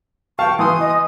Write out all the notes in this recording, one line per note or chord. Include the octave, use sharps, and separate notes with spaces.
F5 G5 A5 C#6
E3 C6 D#6
D#5